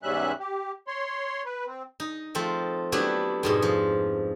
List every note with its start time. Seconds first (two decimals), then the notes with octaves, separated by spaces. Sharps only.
0.03 E2 G#2 G3 C#4 E5 F#6
0.40 G4
0.87 C#5 C6
1.45 B4
1.66 C4
2.00 D#4
2.35 F3 A3 C4
2.92 F#3 A3 B3 D4 E4 G4
3.43 F2 G#2 B2
3.62 F3